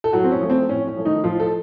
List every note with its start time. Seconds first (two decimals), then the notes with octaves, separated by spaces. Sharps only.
0.04 A4
0.13 A2 F#3 F#4
0.24 C4
0.31 C#4
0.41 F3 A3
0.50 C4
0.69 A2 C#4
0.87 C#4
0.96 F3 A3
1.05 D#3 D#4
1.24 A2 F3 F4
1.40 A4